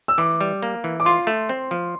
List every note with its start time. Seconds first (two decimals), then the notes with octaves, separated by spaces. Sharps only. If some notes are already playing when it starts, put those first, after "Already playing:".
0.08 E6
0.18 E3 D6
0.41 G3
0.62 A#3
0.84 E3
1.00 D6
1.05 F4 C6
1.27 A3
1.49 C4
1.71 F3